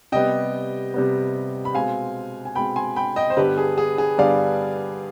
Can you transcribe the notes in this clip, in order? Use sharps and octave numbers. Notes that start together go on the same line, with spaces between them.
C3 G3 B3 D#5 G5
C3 G3 B3
B5
B2 G#3 C4 F5 G#5
G#5
B2 G#3 C4 G5 B5
G#5 C6
G5 B5
D#5 G5
C5
G2 D3 G3 B3 G4 B4
G#4
G#4
G#4
G2 D3 G3 B3 D5 F5